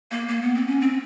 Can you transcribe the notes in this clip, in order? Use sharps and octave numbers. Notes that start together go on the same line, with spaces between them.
A#3
A#3
B3
C4
C#4
C4